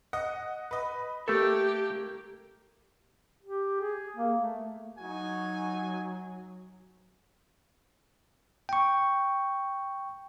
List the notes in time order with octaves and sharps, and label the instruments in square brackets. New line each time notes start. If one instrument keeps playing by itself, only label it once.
[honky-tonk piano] D#5 F#5
B4 D#5
[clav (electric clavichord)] A3 A4 [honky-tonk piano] A#3 [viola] G4
[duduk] G4
G#4
A#3
A3
[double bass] F#3 [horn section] D#4 F#4 G#5
[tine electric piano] G5 C#6